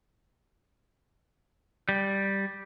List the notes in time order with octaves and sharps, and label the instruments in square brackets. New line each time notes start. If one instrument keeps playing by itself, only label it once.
[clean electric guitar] G3